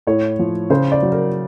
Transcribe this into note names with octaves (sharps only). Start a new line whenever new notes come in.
A2 C#5
F3
C#3 C5
D5
F#3
A#4